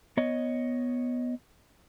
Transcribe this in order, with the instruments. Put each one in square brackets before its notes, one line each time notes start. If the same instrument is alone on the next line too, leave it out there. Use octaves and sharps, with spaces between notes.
[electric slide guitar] B3 C#5 D#5